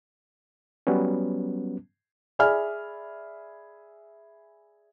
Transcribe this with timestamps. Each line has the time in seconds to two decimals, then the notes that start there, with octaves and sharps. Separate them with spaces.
0.87 F#3 G3 B3 C#4
2.39 G#4 D5 E5 G#5 B5 F6